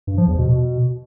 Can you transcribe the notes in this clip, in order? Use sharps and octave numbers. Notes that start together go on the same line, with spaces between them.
G2
F3
E2
B2
B2